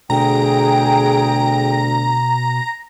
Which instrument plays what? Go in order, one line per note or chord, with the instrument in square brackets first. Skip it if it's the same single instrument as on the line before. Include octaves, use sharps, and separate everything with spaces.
[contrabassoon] D2 [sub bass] B2 [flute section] G#4 G5 [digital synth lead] A#5